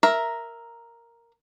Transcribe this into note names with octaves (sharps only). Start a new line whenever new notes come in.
A#4 E5 A#5